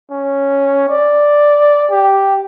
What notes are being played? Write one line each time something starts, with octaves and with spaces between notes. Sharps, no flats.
C#4
D5
G4